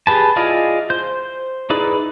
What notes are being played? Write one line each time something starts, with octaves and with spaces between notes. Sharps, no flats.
G4 G#4 B4 A5
E4 F4 G#4 D5 D#5
C5 G6
D#4 E4 G#4 B4 D5